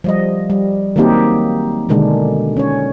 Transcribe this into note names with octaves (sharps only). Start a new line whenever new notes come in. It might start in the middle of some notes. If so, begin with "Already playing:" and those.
F3 G3 D#5
G3
D#3 F#3 A#3 C4 D#4 G4
B2 D3 D#3 G#3 D4
C#4 C#5